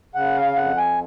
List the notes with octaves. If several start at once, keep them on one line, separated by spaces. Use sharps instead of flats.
C#3 F#5
F5
F2 F#5
G#5